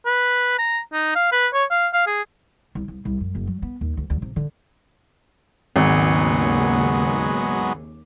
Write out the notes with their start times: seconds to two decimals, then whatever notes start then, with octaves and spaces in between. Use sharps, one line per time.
0.06 B4
0.58 A#5
0.93 D#4
1.15 F5
1.32 B4
1.54 C#5
1.70 F5
1.93 F5
2.07 G#4
2.75 C2
2.88 C2
3.05 C2
3.20 F#2
3.35 F#1
3.47 F#3
3.62 B3
3.81 D#2
3.97 D2
4.10 D2
4.22 C3
4.36 D3
5.76 G#1 D#2 C#3 F#3 G#3 B3